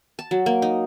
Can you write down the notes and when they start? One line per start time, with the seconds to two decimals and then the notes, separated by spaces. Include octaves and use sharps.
0.19 A5
0.31 F#3
0.46 A#3
0.62 D#4